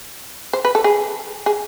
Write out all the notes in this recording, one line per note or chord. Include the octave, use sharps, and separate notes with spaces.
C5
B4
A4
G#4
G#4